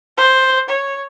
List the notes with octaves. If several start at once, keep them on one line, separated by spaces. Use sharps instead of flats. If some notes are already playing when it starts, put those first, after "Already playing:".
C5
C#5